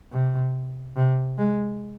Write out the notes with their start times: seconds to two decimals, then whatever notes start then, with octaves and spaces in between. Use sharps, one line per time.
0.12 C3
0.96 C3
1.38 G#3